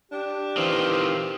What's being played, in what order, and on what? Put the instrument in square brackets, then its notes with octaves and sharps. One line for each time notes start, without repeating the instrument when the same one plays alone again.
[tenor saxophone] D4 [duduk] G4
[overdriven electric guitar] D#3 F4 [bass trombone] E3 [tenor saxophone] C4